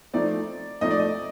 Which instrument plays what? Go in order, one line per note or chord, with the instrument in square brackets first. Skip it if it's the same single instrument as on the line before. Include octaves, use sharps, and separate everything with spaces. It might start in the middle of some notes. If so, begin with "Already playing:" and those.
[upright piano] F3 A3 C4 D#4 [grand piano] D5
[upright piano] F3 A3 C4 D#4 [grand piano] D#5
[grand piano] D5
D#5